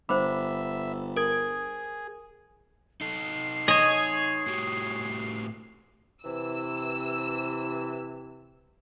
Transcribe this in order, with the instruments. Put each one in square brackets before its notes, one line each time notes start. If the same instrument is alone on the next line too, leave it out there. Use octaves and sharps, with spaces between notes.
[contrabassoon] G1 [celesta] C5 B5 [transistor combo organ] E5 [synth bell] D6
[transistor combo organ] G#4 [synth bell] A#4 D#6 G#6
[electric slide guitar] D#4 A4 [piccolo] C7
[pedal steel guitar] G#4 C#5 [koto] D#5
[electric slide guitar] A2 F#4 G4
[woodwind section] C3 E3 [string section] E6